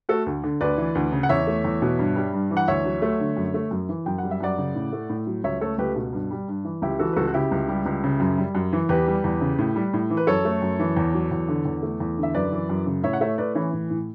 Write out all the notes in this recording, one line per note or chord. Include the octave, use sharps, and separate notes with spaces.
A3 F#4 A4
D2
D3
D2 B4 D5
E3
D2
C#3
F#5
E2 C#5 E5
A3
E2
B2
G2
G3
G2
E3
F#5
D2 C#5 E5
F#3
A3
D3
F#2
A3
F#2
E3
F#2 G5
G3 F#5
E5
F#2 D5 F#5
C#3
A2
A3
A2
F#3
C#2 C#5 E5
A3 A4 C#5
C#2 G4 B4
B2
G2
G3
G2
E3
C#2 E4 G4
E3 F#4 A4
B4
C#2 F#4 A4
F#4
C#3 E4 G4
C#2
G3
C#2
C#3
F#2
G3
F#2
E3
E2 G4 B4
G3
E2
C#3
A2
G3
A2
E3
B4
F#2 A4 C#5
A3
F#2
E3
E2
F#3
E2
D3
E2
A3
E2
D3
E5
F#2 B4 D5
E3
F#2
C#3
A2 C#5 E5
F#5
A3 C#5 E5
A2 B4 D5
E3 C#4 E4
A2
A2